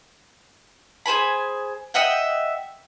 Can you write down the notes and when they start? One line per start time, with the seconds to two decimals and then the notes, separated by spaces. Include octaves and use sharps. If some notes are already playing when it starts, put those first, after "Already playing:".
1.06 G#4 C5 G#5 B5
1.94 D#5 E5 F#5 G5